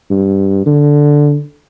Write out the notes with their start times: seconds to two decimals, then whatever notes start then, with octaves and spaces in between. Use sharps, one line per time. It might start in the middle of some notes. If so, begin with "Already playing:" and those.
0.10 G2
0.66 D3